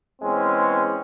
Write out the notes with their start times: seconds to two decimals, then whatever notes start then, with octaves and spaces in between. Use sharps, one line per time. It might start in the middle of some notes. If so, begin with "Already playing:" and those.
0.22 E2 G#3 C4 C#4